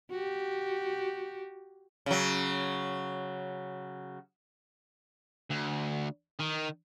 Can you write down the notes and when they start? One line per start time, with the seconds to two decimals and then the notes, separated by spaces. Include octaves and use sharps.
0.10 F#4 G4
2.06 C#3 F#3
5.51 D2
6.39 D#3